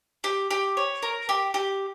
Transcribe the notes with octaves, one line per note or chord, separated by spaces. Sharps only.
G4
G4
C#5
A#4
G4
G4